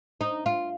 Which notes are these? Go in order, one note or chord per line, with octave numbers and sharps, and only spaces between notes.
D#4
F4